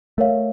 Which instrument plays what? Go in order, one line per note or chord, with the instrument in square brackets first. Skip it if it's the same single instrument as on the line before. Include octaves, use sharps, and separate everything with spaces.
[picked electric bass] A3 [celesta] A#4 C#5 F5